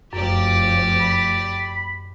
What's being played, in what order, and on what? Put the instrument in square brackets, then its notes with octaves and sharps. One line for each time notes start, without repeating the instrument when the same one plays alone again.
[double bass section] F1 F3 [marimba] F#2 [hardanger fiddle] G4 D5
[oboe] B5